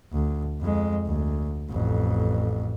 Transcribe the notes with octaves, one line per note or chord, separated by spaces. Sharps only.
D2
F2 G#3
D2
A1 F2